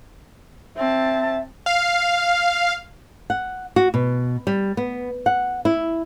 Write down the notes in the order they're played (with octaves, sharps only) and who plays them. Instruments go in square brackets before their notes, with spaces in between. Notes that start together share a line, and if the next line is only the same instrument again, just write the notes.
[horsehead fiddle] C4 A5 [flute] E5
[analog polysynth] F5
[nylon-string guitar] F#5
F#4
B2
G3
B3
F#5
E4